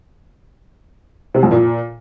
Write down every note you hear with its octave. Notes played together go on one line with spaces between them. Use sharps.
C3
F2
A#2